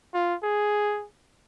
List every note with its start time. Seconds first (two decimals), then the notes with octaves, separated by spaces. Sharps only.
0.14 F4
0.43 G#4